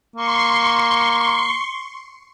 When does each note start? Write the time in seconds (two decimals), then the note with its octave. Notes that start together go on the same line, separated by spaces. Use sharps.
0.16 A#3 C6 C#6